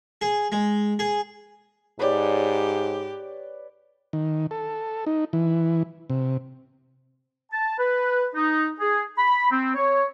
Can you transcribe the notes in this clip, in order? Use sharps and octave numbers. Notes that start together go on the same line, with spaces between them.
G#4
G#3
G#4
G#2 G4 B4 C#5 D5
D#3
A4
D#4
E3
C3
A5
B4
D#4
G#4
B5
C4
C#5